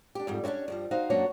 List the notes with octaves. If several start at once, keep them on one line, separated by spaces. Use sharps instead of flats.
D4 G4
F2 G#2 G3
C#4 D4 E4 F#4 C#5
G2 F3 G3
D#4 F#4 C5 F5
F#2 F#3 A#3 D4 F#4 C#5